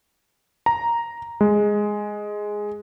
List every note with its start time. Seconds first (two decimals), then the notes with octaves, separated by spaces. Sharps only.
0.66 A#5
1.41 G#3